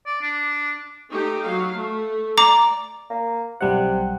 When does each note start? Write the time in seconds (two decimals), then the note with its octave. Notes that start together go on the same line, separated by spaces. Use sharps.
0.06 D5
0.22 D4
1.12 A3 D#4 G4
1.46 F#3 F5
1.75 A3
2.38 D5 A#5 D6
3.10 A#3
3.61 B1 C3 G3 F#5